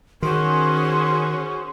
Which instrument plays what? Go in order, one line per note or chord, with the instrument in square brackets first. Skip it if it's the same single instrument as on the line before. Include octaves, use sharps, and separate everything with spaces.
[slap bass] D#3 [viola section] C#4 G#4 C5 [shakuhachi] F#4 [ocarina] C6